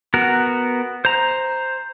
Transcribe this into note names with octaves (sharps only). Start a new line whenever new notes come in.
B3 F#4 A#4
C5 A#5